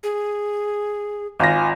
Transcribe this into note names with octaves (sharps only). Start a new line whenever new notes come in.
G#4
G#1 F4 G#5 A#6